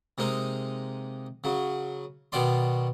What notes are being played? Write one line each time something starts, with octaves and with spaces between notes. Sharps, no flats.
C3 G#3 A#3 D#4
C#3 F#3
B2 D#3 F#4 D5 C6